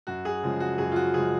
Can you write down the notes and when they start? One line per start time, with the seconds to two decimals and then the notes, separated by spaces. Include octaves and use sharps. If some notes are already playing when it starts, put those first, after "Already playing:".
0.07 F#2 F#4
0.25 G#4
0.43 C#3 F3 G#3
0.60 F#4
0.78 F#2 G#4
0.92 F4
0.96 F#4
1.14 C#3 F3 G#3 G#4